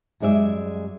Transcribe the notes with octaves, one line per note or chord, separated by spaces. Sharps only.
F#2 G3 G#3 D5 E5